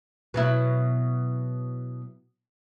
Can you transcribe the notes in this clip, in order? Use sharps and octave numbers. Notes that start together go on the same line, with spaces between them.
B2 F#3 E4